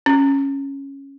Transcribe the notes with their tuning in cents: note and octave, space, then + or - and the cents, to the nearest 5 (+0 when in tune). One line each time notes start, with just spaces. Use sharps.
C#4 -5